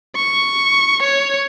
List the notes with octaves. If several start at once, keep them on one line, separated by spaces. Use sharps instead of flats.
C#6
C#5